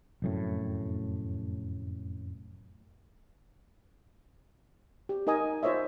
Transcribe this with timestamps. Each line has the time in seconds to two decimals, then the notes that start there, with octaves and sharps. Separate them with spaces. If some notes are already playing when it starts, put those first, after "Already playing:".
0.22 F1 F#2 A2
5.09 G4
5.27 D#4 A#4 D#5 G#5 D#6
5.63 F4 C5 C#5 D#5 E5